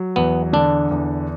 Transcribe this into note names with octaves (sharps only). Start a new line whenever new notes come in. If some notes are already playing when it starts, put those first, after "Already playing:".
Already playing: F#3
E2 B3
D3 D4
E2